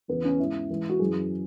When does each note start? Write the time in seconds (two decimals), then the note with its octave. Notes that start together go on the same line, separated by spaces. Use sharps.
0.08 E2 C#3 E3 B3
0.25 C#4
0.39 G#2 E3 E4
0.69 G#2 E3
0.89 F#4
0.99 F#2 E3 G#4